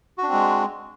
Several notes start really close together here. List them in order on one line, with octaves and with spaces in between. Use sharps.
F#4 D4 C4 G#3